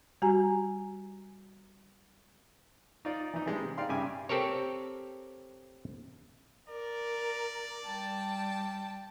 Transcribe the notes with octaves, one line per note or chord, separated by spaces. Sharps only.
G3 F#4 G4 G#5 A#5
D#4 F4 D5
E3 D#4
E3 G3 G#3 D4
C3
D#4 D5 F5 G5 C6
G2 C#3 G4 E5 G#5 D6
C4 G4 A4 A#4 C#5
A#4 D5
G3 G5 A5